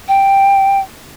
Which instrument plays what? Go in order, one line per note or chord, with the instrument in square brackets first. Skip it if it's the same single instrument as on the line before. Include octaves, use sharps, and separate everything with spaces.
[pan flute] G5